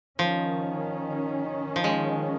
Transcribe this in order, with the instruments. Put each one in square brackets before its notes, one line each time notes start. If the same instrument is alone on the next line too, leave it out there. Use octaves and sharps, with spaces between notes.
[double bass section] D#3 C#4 [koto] F3
[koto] F3
G#3